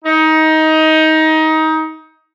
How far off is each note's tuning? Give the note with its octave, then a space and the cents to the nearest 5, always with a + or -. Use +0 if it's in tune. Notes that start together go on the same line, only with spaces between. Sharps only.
D#4 +20